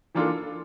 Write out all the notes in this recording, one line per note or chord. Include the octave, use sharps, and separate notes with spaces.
E3 A#3 D4 F4 A4